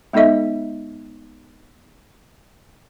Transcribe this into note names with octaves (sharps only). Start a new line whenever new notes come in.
G#3 B3 D#4 A4 D#5 E5